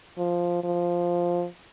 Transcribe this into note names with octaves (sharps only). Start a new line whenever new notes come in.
F3
F3